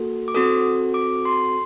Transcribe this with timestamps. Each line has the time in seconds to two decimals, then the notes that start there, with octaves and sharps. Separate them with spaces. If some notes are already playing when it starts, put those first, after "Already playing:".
Already playing: A#3 F#4 A4
0.28 D6
0.35 C4 F#4 A4 D#6
0.94 D6
1.25 C6